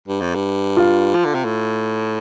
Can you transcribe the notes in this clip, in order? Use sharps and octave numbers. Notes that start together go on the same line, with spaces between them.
G2
F2
G2
F4
F3
D3
C3
A2